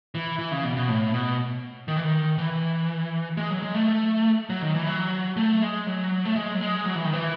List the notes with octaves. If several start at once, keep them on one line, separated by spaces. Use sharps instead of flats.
E3
E3
C#3
B2
B2
A2
B2
D#3
E3
D#3
E3
G#3
F#3
G#3
A3
F#3
D#3
E3
F#3
A3
G#3
F#3
A3
G#3
F#3
G#3
F#3
E3
D#3
E3